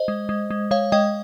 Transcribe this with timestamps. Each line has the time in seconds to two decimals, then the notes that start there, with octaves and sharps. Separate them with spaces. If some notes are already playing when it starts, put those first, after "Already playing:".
Already playing: C5 D#5
0.08 G#3
0.29 G#3
0.51 G#3
0.71 G#3 C#5 F5
0.92 G#3 D#5 G5